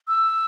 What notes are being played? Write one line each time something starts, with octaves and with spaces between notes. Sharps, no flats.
E6